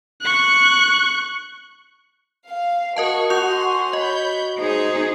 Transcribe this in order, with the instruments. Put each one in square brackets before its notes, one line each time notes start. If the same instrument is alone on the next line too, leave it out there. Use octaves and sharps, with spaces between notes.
[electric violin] C#6 F#6
[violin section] F5
[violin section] F#4 C#6 [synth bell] A#4 D#5 A5
[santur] F#4 [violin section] F#5 G#5 C6 [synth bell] D#6 G6 F7
[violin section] C#5 B5 G6 [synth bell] D#5
[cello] D#4 G#4 [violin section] C5